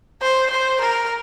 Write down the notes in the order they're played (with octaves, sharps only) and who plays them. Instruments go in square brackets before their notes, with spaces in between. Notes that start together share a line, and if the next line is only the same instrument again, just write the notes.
[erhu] C5
C5
A#4